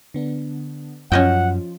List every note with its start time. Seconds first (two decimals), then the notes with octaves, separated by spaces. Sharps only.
0.14 D3 B3 D4
1.12 F#2 F3 C#4 F4 D#5 F#5 G5